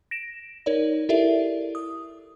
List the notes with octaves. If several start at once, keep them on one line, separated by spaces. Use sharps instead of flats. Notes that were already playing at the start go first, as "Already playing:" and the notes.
A#6 D7 E7
D#4 A#4 C#5 D5
E4 G4 A4 A#4 D5 E5
D#6